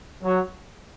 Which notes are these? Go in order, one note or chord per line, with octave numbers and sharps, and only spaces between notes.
F#3